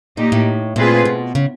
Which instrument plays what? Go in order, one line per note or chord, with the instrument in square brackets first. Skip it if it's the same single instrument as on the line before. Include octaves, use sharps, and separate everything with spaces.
[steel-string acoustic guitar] A#2 [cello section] A#3 D#4 G4
[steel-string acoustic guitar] A2
[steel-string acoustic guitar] A#2 [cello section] A3 C4 F4 G#4 B4
[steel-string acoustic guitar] B2
C#3